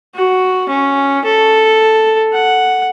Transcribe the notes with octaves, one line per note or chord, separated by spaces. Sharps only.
F#4
C#4
A4
F#5